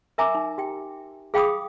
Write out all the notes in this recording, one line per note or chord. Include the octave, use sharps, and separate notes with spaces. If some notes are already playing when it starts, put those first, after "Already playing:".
A#4 E5 G#5 A#5 D6
D#4
G4 G5
G#4 F5 G5 B5 D6 D#6